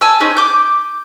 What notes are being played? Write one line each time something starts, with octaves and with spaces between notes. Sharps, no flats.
G#5 A5 E6
C4 C#4 D#4 G#4
D6 G6